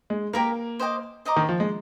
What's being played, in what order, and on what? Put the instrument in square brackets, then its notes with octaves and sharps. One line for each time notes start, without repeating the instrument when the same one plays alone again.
[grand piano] G#3
[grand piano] A#3 [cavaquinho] G4 A#4 F5
[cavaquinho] C5 D#5 G5 D6
C5 D#5 A#5 D6
[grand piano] D#3
F3
G#3